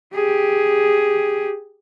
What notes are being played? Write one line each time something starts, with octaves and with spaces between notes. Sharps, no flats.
G4 G#4